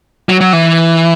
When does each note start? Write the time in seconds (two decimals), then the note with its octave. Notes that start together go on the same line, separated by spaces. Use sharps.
0.29 F#3
0.41 F#3
0.53 E3